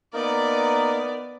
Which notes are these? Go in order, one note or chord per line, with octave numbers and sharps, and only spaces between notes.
A#3 B3 D#4 A#4 D5